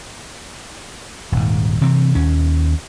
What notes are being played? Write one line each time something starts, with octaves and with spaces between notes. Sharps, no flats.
D#1 G#2
C3 E3 C4
D#2 C#4